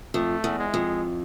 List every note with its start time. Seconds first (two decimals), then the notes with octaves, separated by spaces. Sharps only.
0.14 F2 A3
0.44 E2
0.59 G#3
0.74 F2